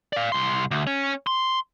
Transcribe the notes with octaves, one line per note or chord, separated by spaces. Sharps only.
D5 F5
C2 C6
D2
C#4
C6